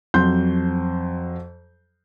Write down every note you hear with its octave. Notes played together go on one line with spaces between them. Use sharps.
F2 F#3 C6 G6